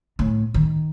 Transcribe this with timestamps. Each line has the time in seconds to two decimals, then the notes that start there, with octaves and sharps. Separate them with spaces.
0.19 A2
0.54 D#3